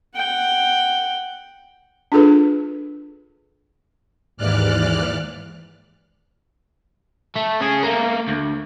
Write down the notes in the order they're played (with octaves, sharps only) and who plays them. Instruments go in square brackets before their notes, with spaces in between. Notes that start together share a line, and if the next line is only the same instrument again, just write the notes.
[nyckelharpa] F#5 G5
[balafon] D4 F4 G#4 A4 B4
[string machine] D#2 G#2 E3 D5 F6 F#6
[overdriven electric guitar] A3
C#4 G#4
A3 A#3
D2